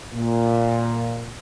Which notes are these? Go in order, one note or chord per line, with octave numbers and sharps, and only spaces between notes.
A#2